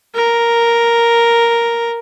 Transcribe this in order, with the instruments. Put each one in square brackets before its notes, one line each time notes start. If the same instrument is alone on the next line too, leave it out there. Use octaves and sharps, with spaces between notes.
[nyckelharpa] A#4